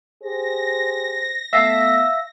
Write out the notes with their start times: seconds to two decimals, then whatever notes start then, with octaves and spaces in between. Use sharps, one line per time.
0.23 G4 G#4 C5 A#6
1.53 A3 B3 E5 F5 A5